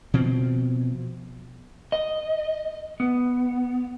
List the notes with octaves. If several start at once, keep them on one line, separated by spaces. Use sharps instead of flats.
B2 F3 C4
D#5
B3